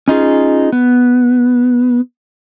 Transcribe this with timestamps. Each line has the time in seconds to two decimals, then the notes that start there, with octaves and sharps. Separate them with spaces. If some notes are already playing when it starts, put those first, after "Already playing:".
0.08 C#4 D#4 F4 G#4
0.72 B3